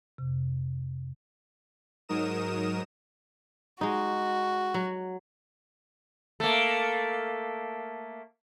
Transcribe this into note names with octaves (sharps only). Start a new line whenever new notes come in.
F2 C3
G#2 F#3 D#4 A#4 D#6 E7
G#3 D#4 F#4
F#3
A3 A#3